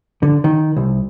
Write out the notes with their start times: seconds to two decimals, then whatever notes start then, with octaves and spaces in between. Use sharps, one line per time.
0.23 D3
0.44 D#3
0.77 C2